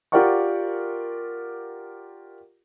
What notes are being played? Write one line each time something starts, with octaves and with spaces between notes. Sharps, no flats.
F4 G4 A#4 D5 F#5 C#6